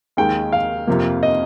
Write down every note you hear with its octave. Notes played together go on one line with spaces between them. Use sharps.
D#2 D#3 G#3 G5
F5
F2 C3 F3 A#3
D#5